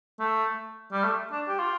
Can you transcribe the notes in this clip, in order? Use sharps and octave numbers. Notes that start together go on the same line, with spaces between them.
A3
G3
A3
D4
G4
F4